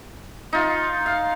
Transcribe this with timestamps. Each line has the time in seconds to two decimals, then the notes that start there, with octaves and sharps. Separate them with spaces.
0.53 D#4 F4
1.06 F5